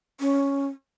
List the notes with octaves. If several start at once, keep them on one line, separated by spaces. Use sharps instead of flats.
C#4